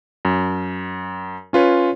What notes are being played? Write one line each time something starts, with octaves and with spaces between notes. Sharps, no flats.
F#2
C#4 F4 B4 C#5